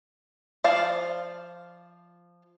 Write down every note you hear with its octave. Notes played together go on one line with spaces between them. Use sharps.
F3 D5 F5 A5